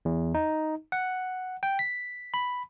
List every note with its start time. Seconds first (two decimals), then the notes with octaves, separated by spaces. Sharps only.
0.05 E2
0.34 D#4
0.92 F#5
1.63 G5
1.79 B6
2.34 B5